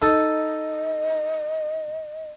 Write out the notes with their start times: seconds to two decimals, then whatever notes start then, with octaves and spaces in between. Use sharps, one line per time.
0.02 D#4 A4 D#5